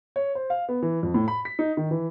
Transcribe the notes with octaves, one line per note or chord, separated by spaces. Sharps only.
C#5
C5
F5
B3
E3
F2
A2
B5
B6
D#4
D#3
E3